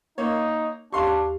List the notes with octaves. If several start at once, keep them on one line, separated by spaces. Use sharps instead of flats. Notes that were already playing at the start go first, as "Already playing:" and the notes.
A#3 D#4 C#5
D#2 D4 G4 F5 C6 C#6